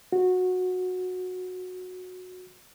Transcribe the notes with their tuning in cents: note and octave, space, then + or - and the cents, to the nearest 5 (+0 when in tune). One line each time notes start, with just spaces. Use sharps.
F#4 -15